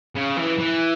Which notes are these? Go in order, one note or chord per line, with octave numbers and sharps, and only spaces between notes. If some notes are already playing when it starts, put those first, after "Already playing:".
C#3
E3
E3